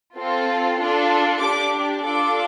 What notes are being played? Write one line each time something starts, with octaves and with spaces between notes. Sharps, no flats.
C4 F4 A4
D4 F4 A4
D4 G4 D6
D4 F4 A4 D6